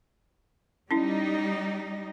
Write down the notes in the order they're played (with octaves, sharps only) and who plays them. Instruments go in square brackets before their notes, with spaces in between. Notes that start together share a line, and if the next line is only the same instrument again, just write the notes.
[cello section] G3 D#4 [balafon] C#4 E4